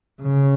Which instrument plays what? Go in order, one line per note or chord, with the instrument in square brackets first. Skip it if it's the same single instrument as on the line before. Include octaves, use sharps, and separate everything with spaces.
[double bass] C#3